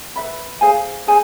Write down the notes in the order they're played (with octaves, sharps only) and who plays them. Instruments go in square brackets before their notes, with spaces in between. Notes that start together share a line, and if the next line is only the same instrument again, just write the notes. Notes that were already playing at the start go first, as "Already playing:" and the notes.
[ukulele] B4 E5 B5
G#4 C5 F5 G#5
G#4 C5 G#5